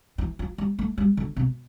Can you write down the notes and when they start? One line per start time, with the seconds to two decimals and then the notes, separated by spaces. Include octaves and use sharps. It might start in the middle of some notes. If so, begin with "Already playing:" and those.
0.18 E3
0.39 F3
0.58 G3
0.79 A3
0.98 G3
1.17 D3
1.36 C3